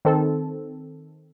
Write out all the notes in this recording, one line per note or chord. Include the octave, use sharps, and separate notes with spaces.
D#3 C4 A4